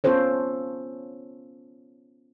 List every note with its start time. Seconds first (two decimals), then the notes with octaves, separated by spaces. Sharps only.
0.04 B3 C#4 F4 A4 C5 C#5